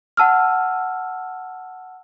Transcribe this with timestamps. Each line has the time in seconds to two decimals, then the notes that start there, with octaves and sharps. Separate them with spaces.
0.17 F#5 A5 E6 F6